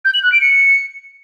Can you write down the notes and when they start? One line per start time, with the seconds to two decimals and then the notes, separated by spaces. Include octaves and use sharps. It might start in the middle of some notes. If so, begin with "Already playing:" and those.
0.05 G6
0.14 F#7
0.23 F#6
0.32 D7
0.41 C#7